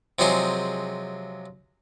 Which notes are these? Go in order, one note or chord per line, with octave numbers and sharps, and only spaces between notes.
C3 F3 F#3 G#3 G#4 C5